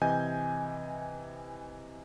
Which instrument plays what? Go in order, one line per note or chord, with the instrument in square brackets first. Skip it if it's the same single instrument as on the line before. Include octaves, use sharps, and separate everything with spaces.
[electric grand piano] C3 E3 D#5 G#5 G6